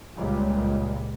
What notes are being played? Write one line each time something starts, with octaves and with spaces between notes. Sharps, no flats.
C#2 A#2 G3 G#3